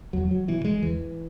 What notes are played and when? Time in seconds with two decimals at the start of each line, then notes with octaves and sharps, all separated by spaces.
0.13 E2 F#3
0.31 F#3
0.48 B2 E3
0.65 G#3
0.83 E2 E3